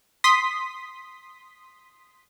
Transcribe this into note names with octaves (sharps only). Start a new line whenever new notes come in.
C6 D#6 B6